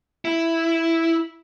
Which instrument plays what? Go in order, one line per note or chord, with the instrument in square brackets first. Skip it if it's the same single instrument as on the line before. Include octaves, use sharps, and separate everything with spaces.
[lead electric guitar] E4